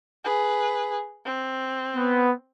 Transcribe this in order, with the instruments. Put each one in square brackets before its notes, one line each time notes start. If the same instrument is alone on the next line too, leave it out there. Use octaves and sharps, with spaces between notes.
[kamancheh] G#4 B4
C4
[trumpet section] B3